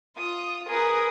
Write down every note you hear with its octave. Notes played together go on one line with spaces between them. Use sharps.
F4 D#6
G#4 A#4 B4 D#6